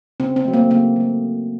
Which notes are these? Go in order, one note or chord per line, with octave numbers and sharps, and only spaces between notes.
C#3 C4
C4
F#3 A3
A#3
C#3 A#3
F#3 A3